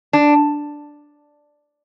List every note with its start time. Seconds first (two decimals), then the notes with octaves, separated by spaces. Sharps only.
0.13 D4